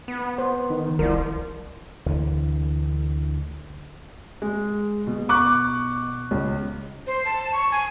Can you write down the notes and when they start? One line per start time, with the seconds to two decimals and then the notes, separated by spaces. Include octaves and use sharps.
0.08 B3
0.38 C5
0.70 D#3
0.99 D#1 C2 F3 A#4
2.06 D2 D3 E3
4.42 G#3
5.07 B2
5.29 C#6 D6 F#6
6.31 C#2
7.07 C5
7.25 A5
7.53 C#6
7.72 G#5